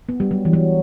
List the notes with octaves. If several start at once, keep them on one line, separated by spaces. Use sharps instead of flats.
B3
G3
F#3
E3
F#3